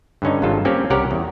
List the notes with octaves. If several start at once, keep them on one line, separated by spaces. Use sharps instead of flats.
G2 D3 C#4 D#4
G#1 G2 C3 F4 A4
A#3 C4 C#4 G4
C2 C3 C#4 G4 A#4 F#5
E2